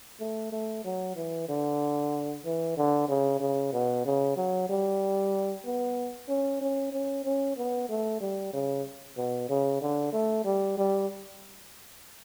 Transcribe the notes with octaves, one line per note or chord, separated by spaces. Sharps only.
A3
A3
F#3
E3
D3
E3
D3
C#3
C#3
B2
C#3
F#3
G3
B3
C#4
C#4
C#4
C#4
B3
A3
G3
C#3
B2
C#3
D3
A3
G3
G3